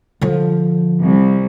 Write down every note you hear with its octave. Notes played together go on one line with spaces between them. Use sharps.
D3 F3
C2